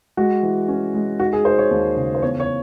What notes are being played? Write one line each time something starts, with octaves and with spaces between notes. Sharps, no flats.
G#3 F#4
E3
C#4
G#3
D#4 F#4
G#4
D#4 C5
C#5
D#2
C#3
C5
E2 C#5
C#5